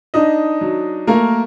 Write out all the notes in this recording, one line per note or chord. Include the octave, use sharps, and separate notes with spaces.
D4 D#4 D#5
F#3
A3 A#3 A#4